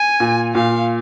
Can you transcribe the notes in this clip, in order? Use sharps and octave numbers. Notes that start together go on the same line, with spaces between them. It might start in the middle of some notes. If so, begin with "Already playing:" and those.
Already playing: G#5
A#2
A#2 F5